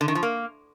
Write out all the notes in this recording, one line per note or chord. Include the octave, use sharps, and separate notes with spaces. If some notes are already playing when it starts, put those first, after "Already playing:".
D3
D#3
F3
A#3